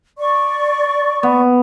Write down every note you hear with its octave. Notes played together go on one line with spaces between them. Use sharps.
D5 C#6
B3